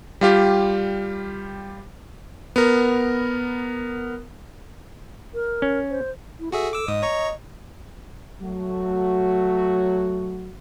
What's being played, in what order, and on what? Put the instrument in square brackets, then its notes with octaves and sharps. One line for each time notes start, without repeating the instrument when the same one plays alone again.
[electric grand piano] G3 F4 G4
B3 A#4
[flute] A#4
[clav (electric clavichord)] C#4
[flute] C5
[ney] E4
[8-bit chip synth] F#4 G#4 E5 [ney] A4
[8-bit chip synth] D6 E6
[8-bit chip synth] G#2 D#6 [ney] D#5
[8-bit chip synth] C#5 A#5 C#6
[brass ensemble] F#3 A3 F#4